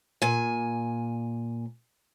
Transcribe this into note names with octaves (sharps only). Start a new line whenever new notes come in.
A#2 G#5